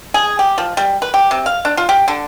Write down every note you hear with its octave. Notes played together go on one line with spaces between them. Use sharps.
G#4
G4
F3
G3
B4
G4
C3
F5
D4
F4
G4
D3